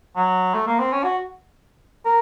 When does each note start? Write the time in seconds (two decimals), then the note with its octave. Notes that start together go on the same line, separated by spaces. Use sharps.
0.16 F#3
0.54 A3
0.67 A#3
0.79 C4
0.92 C#4
1.04 F#4
2.05 A#4